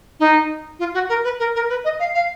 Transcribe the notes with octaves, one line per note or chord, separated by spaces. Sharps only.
D#4
F4
F#4
A#4
B4
A#4
A#4
B4
D#5
F5
F5